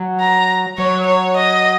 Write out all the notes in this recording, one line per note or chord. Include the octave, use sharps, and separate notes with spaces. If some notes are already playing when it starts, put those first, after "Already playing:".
Already playing: F#3
A#5
F#3 C#5
C#5
D#5